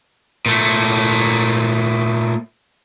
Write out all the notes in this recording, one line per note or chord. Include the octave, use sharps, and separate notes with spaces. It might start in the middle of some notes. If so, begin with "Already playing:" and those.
A#2 A3